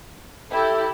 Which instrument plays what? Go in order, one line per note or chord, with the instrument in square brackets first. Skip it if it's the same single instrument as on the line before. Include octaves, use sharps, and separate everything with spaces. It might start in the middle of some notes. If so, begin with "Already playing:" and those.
[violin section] E4 G4 [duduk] A4